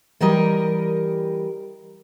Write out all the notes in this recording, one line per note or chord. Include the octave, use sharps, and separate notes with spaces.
E3 G3 G4 A#4 D#5